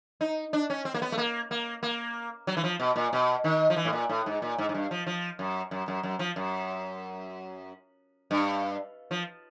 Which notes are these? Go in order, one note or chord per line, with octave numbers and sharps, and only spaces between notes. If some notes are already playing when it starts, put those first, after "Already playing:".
D#4
D4
C#4
C4
A#3
B3
A3
A#3
A#3
A#3
F#3
E3
F3
B2
A#2
B2
D#3
F3
E3
A2
A#2
A2
G#2
A#2
G#2
G#2
G2
F3
F3
F#2
F#2
F#2
F#2
F3
F#2
G2
F3